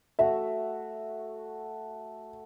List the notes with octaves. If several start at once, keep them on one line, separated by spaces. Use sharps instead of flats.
A3 F#4 E5